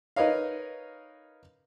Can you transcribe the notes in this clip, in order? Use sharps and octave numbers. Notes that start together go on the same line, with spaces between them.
D#4 A#4 B4 C#5 D#5 F5